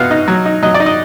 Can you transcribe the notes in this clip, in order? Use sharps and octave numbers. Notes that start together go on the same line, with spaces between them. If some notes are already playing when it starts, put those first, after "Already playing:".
Already playing: B2 B3 F5 F#5
D#4
F#3
D#4
F#3 D#5
D5
D#4
D#5